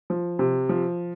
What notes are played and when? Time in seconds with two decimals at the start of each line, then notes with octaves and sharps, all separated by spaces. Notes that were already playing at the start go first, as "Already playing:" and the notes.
0.10 F3
0.39 C3
0.69 F3